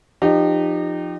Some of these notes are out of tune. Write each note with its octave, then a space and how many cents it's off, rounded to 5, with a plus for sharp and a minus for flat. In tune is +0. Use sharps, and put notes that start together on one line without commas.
F3 +0 D#4 -25 G4 +0